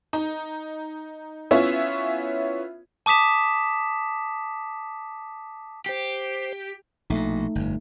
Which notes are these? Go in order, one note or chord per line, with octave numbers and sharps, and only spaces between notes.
D#4
B3 C#4 E4 F4 E5
A5 D6 D#6 B6 E7
G4 C5 C7
A#1 B2 A3 D#4
G1 F2